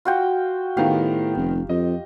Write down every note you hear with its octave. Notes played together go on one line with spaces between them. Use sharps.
F4 F#4 G5
A2 D#3 B3 G4 F5
F1
F2 D#5